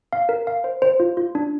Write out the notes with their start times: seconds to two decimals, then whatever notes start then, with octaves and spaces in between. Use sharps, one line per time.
0.13 F5
0.29 A#4
0.47 F5
0.64 C5
0.82 C5
1.00 F4
1.17 F4
1.35 D4